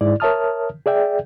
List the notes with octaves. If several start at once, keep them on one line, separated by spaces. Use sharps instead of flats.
G#2 E4 D5
A#4 C#5 E5 A5 D#6 F6
G#4 D5 E5 G5